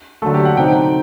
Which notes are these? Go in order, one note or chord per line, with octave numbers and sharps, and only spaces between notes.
D3 F#3 A3 A4
G4
F#5
C3 F#3 C4 D#4 G5